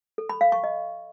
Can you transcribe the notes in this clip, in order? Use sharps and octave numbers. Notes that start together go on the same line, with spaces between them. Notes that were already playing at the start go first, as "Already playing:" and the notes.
A4
B5
F5
C#6
D#5